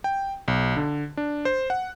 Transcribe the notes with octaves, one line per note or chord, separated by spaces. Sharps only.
G5
B1
D3
D4
C5
F#5